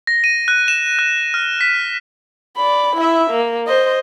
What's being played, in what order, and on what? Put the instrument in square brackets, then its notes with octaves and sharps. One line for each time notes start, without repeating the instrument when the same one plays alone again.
[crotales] A#6
D#7
F#6
E7
F#6
F6
B6
[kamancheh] D5 B5
E4 E5
A#3
C5 D#5